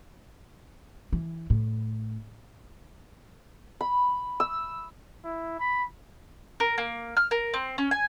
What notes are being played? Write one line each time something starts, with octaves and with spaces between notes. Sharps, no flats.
E3
A2
B5
E6
E4
B5
A#4
A#3
F6
A#4
C4
C#4
G#5